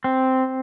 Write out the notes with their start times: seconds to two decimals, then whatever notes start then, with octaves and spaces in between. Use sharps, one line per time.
0.04 C4